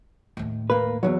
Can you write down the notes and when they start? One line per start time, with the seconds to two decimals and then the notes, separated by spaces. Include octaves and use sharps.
0.37 D#2 A2
0.70 A#3 B4
1.03 E2 G#2 F#3